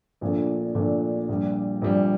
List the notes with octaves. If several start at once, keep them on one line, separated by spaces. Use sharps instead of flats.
A#1 A#2 F3 A3 D4
A#1 A#2 F3 A3 D4
A#1 A#2 G3
A#1 A#2 G3